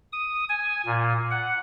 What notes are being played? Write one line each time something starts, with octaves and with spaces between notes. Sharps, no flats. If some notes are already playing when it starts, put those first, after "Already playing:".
D#6
G#5
A#2
F#5